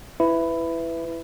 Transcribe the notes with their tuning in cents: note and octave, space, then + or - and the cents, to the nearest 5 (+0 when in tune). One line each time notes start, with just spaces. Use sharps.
E4 +10 B4 +15